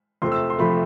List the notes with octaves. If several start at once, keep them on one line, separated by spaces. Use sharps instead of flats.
F2 C3 F3 A3 C6
E6
C6
C3 F3 A3 B5